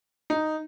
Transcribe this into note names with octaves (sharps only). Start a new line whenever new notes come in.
D#4